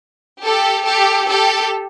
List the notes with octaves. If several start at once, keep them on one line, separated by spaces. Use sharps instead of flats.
G4 A4
G4 A4
G4 A4